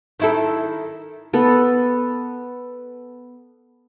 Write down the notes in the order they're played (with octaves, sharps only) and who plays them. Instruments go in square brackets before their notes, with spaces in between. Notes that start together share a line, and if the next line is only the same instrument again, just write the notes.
[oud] D#3 E4 A4
[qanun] B3 A4